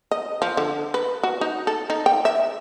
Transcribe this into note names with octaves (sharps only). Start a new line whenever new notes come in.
D#5
F3
D3
B4
F#4
D#4
A4
D#4
G5
E5